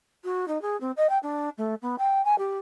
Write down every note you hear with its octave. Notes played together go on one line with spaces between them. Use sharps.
F#4
D#4
G#4
C4
D#5
G5
D4
A3
B3
G5
G#5
G4